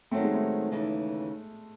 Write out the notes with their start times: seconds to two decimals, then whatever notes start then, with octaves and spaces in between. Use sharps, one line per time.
0.11 D#3 F#3 A3 C4
0.24 G#3
0.35 A3
0.72 D#2 C#3 E3